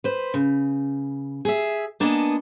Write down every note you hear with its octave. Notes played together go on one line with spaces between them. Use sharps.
B4 C5
C#3
G#4 E5
A#3 B3 D4 D#5 G#5 A5